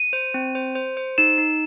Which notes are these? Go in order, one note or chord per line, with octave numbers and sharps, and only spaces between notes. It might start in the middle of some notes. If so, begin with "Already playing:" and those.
Already playing: D#7
C5
C4
C5
C5
C5
D#4 E7
D#4